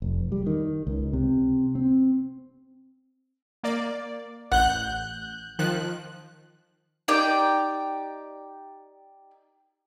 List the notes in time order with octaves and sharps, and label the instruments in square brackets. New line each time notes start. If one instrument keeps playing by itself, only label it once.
[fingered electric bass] F1
G3
D#3
C#2
C3
C4
[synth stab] A#3 D5
[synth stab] A1 F#6 G6 [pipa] F#5
[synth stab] D#3 F3 F#6
[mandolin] D#4 G4 D5 G5